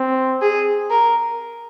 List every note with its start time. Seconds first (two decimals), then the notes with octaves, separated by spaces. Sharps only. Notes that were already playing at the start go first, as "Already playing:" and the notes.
Already playing: C4
0.42 G#4
0.91 A#4